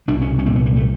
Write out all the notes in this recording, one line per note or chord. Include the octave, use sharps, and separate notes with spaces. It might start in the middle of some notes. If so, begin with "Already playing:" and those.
C2 B2 D4
C#4
C#4
C2 A#2 C4
B3
A#3
A3